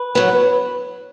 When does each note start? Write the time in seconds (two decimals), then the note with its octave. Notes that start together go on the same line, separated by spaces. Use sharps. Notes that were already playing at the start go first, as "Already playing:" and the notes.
Already playing: B4
0.15 F#3 B3